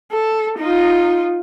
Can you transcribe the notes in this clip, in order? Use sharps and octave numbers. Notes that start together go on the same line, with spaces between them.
A4
D#4 F4